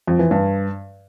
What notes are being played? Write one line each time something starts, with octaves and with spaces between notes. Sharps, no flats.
F2
E3
G2